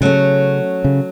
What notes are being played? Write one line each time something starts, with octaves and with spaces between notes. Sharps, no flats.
C#3 F#3 A3 C#4
C#3